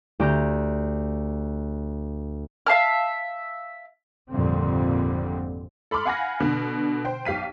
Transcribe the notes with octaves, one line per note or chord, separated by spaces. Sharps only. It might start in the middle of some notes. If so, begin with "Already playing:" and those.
D2 G4 A#5 G6
E5 F5 A5 F6
G#1 F2 A#2 D3 G3 C4
A4 B5 C6 D6 F6
F5 F#5 G#5 B5 F6 A#6
B2 D3
C5 G5
B1 G4 F5 B6 D#7